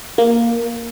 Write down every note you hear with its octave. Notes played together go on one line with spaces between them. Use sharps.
A#3